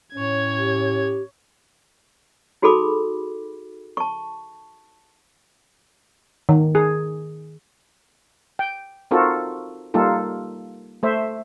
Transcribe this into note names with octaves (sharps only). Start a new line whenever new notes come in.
A2 C#4 C#5 G#6
G4
D#4 F#4 G#4 A4 B5 D6
A5 C#6
D#3
G#4
G5
C4 D#4 F4 F#4 A4 A#4
G3 A#3 D#4 F4 A4
A3 C5 E5